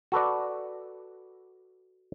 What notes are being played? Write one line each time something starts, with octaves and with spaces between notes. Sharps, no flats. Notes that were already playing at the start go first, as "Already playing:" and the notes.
F#4 A4 B4 D5